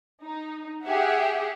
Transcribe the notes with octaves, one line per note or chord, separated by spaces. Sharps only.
D#4
G4 G#4 E5 F#5